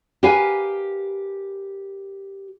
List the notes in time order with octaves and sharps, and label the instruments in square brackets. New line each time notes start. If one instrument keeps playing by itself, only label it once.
[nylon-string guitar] G4 A#4 B4 F5 G#5